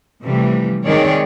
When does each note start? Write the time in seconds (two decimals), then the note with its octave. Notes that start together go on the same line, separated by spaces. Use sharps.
0.24 C3 E3 F3 G3 A3
0.85 D#3 G#3 C4 G#4 C#5 D5